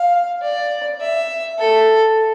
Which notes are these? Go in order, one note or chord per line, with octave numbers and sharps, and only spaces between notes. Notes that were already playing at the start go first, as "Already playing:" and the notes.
Already playing: F5
D5
E5
A4